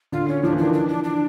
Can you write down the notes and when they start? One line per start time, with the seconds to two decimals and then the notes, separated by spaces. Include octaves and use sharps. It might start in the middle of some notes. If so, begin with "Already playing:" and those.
0.12 D3 F4
0.28 C#4
0.43 F3 D4
0.52 E3
0.58 D#3 D4
0.70 E3 D4
0.89 D4
1.04 D4